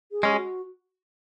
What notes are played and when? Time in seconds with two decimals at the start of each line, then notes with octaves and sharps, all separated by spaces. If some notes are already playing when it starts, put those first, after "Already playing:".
0.12 G#4
0.23 G#3 C#4
0.31 G4
0.36 F#4